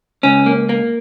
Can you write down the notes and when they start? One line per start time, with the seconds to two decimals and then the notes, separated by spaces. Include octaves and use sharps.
0.23 C#2 C#4
0.46 A#3
0.69 A#3